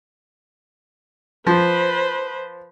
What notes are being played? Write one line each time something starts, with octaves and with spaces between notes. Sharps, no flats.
F3 B4 C5